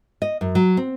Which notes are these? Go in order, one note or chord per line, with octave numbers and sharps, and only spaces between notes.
D#5
F#2
F#3
C4